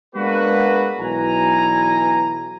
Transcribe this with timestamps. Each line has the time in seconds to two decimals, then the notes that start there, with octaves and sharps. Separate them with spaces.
0.15 G#3 A#3 B3 D4 F#4 B4
0.99 B1 E3 G#5 A#5